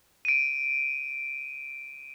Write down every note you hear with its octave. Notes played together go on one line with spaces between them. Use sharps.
D7 D#7